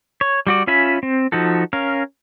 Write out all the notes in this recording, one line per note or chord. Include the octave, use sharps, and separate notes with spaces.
C#5
G3 F#4 D5
C#4 F4 E5 G#5 B5
C4
F3 D#4 F#4 A4
C#4 A#4 F5